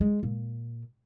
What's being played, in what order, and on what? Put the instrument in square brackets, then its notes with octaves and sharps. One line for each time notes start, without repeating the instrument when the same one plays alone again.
[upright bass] G#3
A#2